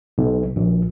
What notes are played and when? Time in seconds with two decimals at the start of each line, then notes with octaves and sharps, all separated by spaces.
0.18 B1
0.56 A#1